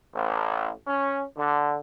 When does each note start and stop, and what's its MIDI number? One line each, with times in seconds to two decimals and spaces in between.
0.14 0.70 33
0.87 1.22 61
1.37 1.77 50